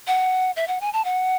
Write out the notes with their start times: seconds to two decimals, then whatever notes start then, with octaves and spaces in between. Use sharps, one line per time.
0.08 F#5
0.56 E5
0.68 F#5
0.81 G#5
0.93 A5
1.05 F#5